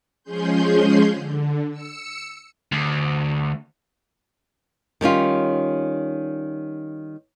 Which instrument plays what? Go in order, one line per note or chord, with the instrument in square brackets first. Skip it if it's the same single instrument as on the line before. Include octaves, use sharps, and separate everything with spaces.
[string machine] F3 G#3 C#4 G#4 C6 G6
D3
E6 C#7
[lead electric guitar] D2
[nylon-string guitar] D#3 G3 C#4 F4